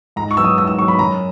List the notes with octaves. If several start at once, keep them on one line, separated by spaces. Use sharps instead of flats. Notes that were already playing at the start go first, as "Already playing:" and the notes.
G#2 A#5
C#6
F#3 B3 E6
D#6
G#2 E6
E6
F#3 B3 C#6
B5
F#2 A#5